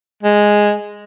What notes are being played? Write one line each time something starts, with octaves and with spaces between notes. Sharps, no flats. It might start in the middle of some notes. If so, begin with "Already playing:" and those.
G#3